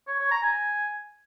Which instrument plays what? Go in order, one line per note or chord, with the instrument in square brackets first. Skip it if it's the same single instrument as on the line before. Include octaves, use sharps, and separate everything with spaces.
[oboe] C#5
C#5
A#5
G#5